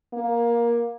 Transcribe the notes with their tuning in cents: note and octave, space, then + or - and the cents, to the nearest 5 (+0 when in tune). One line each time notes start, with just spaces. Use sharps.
A#3 +15